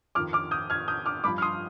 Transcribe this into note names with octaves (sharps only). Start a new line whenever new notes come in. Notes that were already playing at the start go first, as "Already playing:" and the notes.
F2 D#3 D6 F6
D6 F6
D#6 G6
F6 G#6
D#6 G6
D6 F6
G2 F3 B5 D6
F6
C6 D#6